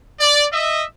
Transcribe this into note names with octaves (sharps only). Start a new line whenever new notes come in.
D5
D#5 E5